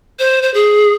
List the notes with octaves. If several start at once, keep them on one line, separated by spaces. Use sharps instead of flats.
C5
C5
G#4